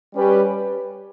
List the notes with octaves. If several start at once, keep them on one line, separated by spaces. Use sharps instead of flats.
G3 C#4 G4 B4